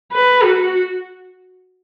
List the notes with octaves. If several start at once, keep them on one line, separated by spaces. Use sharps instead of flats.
B4
F#4